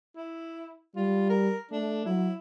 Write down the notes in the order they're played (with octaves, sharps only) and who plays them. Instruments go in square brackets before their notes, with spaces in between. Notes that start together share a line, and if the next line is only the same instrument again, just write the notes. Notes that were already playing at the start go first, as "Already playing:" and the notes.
[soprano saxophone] E4
[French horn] G3 [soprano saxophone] F4
[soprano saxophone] A#4
[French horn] A3 [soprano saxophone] D4
[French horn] F#3 [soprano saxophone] E4